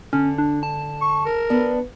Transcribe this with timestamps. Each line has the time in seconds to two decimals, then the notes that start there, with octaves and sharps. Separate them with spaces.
0.13 D3 C#4
0.38 D4
0.63 A5
1.01 C#6
1.25 A#4
1.50 B3 D4